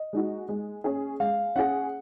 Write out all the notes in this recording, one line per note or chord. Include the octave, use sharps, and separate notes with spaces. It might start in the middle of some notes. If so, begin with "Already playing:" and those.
Already playing: D#5
G#3 D#4 F#4
G#3
C#4 G#4
G#3 F5
C#4 G#4 F#5